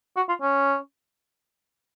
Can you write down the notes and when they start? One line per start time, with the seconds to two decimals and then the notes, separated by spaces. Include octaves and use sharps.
0.16 F#4
0.29 F4
0.42 C#4